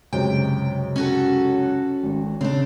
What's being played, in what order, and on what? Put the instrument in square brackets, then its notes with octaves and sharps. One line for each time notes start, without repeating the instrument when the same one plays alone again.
[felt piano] C#2 F#2 C3 [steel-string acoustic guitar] G5
[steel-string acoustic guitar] C#4 F#4 A4
[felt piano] G#1
[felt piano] C#3 [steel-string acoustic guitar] C4 D4